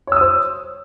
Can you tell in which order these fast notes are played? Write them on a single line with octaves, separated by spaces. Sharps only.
C#5 E6 D#6 C5